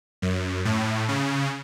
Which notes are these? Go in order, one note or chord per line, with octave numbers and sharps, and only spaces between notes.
F#2
A2
C#3